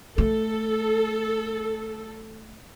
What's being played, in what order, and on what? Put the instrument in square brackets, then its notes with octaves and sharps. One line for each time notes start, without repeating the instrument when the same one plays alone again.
[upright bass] A3 [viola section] A4